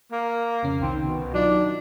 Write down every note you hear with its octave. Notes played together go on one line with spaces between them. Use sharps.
A#3
F2 C#3 C#4
C2 D#3 C4
B2
F#3 D4 D#4 F4